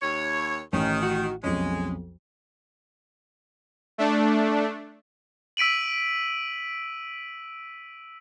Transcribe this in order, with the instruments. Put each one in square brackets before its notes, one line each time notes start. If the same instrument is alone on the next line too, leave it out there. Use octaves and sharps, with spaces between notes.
[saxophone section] D#2 C#5
[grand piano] A1 [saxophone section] D#3 [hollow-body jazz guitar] C#4
[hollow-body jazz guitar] F#4
[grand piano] B1 F2 [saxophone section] G#3 [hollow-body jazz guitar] C#4
[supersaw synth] A3 D4
[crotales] E6 B6 D7 D#7 F#7